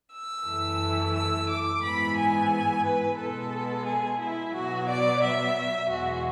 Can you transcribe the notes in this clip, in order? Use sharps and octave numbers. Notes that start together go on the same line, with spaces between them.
E6
F#2 E3 A3
E6
D6
G#2 E3 B3 B5
G#5
B4
B2 G#3 B3 A4
G#4
E4
B2 F#3 B3 F#4
D5
E5
E2 B2 G#3 F#4